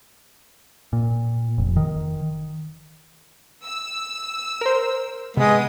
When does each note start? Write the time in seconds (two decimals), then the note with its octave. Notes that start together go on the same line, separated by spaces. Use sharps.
0.93 A#2
1.58 F1
1.77 D#3
3.65 E6
4.61 A#4 C5
5.37 C3 G#3 B3 B4 D#6